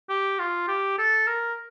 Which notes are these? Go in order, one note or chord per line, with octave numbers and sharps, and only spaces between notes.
G4
F4
G4
A4
A#4